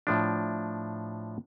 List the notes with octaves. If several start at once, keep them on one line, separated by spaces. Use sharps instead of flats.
A2 F3 D4